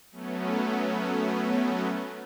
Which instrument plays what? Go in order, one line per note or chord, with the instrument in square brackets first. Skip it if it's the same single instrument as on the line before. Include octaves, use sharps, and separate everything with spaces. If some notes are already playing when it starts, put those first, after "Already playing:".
[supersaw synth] F#3 A3 B3 C#4